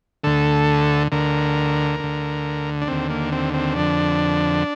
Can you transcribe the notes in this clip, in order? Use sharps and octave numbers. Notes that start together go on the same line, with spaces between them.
D2 D3 A4
D2 D3 A#4
D2 D3
D4
D#2 D3 C4
A#3
C4
C4
F2 D3 D4